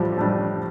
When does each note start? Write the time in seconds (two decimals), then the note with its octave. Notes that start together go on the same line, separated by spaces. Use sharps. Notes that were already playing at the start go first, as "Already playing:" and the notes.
Already playing: A2 F3 G3 D4
0.17 A2 G3 D4